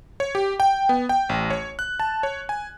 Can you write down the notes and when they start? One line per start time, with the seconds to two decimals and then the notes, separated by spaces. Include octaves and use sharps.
0.20 C#5
0.35 G4
0.60 G5
0.89 B3
1.09 G5
1.29 A1
1.50 C#5
1.79 F#6
2.00 A5
2.23 C#5
2.49 G#5